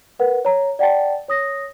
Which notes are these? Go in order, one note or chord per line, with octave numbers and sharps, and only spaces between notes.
A#4 B4 F#5
C#5 A#5
D5 F#5 G5 A5 A6
C#5 D#6 A#6